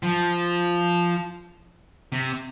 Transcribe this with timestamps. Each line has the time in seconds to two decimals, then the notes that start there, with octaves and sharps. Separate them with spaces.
0.03 F3
2.12 C3